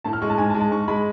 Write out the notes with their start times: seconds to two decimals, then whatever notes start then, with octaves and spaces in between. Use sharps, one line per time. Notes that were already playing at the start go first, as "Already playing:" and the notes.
0.04 A2 A5
0.13 F6
0.22 G#3 C#6
0.30 A5
0.38 G#2 G#5
0.50 A5
0.54 G#3
0.60 A5
0.71 G#2 C#6
0.88 G#3 B5